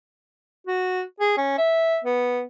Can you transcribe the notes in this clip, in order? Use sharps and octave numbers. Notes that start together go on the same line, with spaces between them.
F#4
G#4
C#4
E5
B3